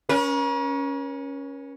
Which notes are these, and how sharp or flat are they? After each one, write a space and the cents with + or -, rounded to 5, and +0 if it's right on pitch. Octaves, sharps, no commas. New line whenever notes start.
C#4 +0 A#4 +45